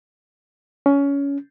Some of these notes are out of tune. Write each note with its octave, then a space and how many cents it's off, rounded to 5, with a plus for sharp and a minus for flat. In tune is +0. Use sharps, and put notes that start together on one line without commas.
C#4 +20